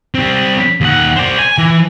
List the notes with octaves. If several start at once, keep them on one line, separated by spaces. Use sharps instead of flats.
G3 C4
D#2 F#5
C5 D5
G#5
E3